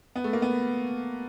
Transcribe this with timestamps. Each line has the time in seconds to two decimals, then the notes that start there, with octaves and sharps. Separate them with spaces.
0.16 B3
0.24 A3
0.33 A#3
0.42 B3